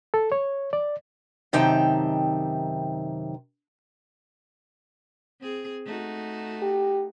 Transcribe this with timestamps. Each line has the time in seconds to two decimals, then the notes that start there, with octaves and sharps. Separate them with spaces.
0.14 A4
0.32 C#5
0.73 D5
1.53 F#2 C3 D#3 D#4 G5 A5
5.41 C4 G#4
5.86 A3 D#4 F#4
6.62 G4